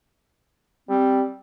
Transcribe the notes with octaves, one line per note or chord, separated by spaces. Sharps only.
G3 C4